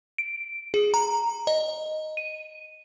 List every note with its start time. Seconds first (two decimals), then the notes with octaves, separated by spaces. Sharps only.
0.18 D7
0.74 G#4
0.94 A#5
1.47 D#5
2.17 D#7